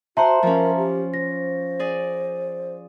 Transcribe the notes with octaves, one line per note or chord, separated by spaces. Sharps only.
F#4 C5 E5 F#5 A5 A#5 C6
F3 C#4 A#4
G4
C5 A#6
G#4 D5